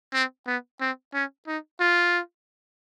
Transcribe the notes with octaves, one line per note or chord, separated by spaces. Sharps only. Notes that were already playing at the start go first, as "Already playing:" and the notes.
C4
B3
C4
C#4
D#4
F4